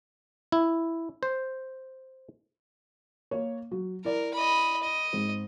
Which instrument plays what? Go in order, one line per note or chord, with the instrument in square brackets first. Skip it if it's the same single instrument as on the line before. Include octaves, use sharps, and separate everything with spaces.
[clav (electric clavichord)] E4
C5
[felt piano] A#3 C#5
F#3
[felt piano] E4 D5 [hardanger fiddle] A#4
[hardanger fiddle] D#5 B5
D#5
[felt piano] G#2 C4